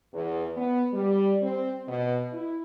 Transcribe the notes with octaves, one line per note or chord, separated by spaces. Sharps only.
E2
B3
G3
C4
B2
E4